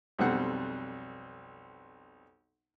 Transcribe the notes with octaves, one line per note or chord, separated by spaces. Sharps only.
B1 F2 G3 C4 C5 F#5